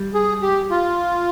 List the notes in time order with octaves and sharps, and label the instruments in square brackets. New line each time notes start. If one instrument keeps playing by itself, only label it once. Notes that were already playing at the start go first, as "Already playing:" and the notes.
Already playing: [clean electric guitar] G3
[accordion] G#4
G4
F4